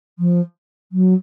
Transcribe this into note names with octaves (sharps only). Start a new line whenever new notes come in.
F3
F#3